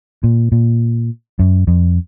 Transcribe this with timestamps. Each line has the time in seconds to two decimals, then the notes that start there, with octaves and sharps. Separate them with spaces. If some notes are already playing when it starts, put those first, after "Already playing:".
0.24 A#2
0.52 A#2
1.39 F#2
1.67 F2